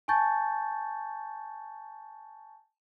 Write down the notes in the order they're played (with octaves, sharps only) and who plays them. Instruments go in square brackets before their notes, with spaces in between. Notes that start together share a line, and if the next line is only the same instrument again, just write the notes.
[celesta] G#5 A5 C#6 G6 A6